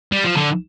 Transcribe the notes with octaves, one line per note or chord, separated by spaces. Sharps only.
G3
F3
D3